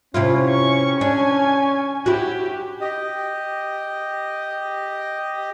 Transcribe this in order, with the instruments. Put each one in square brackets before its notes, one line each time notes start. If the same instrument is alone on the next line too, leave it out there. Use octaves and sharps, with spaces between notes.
[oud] C3 E4 F4 [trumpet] C#4
[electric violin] C#6
[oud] D4 [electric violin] G#5
[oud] E4 F#4 [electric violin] G4
[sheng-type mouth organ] G4 D#5